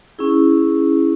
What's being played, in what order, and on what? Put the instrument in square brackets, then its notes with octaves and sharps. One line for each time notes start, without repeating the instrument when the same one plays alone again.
[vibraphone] C#4 E4 G#4